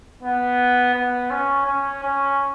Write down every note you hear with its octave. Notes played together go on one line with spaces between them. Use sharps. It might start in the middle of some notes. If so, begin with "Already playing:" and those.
B3
B3
C#4
C#4
C#4